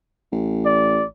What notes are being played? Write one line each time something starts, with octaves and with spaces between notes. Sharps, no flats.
A1
D5